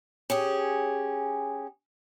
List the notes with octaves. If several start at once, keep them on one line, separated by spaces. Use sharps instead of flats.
C#4 G4 G#4